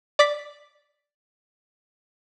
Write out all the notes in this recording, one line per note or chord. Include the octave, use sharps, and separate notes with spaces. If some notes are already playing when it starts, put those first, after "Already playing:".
D5 D6 B6